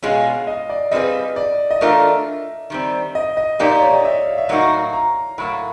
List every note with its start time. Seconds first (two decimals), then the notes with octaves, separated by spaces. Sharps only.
0.03 B2 G#3 C#4 F4 G#4 F5
0.47 D#5
0.70 D5
0.91 G3 C4 F4 G#4 B4 D#5
1.36 D5
1.71 D#5
1.81 E3 A3 D4 F4 A#4 E5
2.70 D#3 G3 C4
3.15 D#5
3.37 D#5
3.59 A#2 F3 A#3 D#4 G4 D5
3.70 D5
3.82 C#5
3.93 D#5
4.05 E5
4.26 F5
4.38 E5
4.48 A2 F#3 A#3 D#4 F#4 F5
4.93 A#5
5.38 A2 F#3 A#3 B5